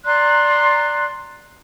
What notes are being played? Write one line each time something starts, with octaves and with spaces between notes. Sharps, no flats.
D5 A#5 C6 F#6